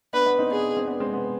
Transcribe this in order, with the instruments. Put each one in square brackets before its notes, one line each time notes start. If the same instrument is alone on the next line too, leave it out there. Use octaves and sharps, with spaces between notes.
[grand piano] B3 D4 [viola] B4
[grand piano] B3 D4
C4 D#4
[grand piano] B3 D4 [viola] G#4
[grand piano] C4
B3 D4
G#3 C4
B3